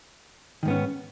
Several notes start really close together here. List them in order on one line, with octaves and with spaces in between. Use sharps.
D#3 G#2 B3 C#4